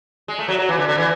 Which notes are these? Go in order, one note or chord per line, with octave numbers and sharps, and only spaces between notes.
G#3
A3
F#3
F#3
E3
D3
D3
E3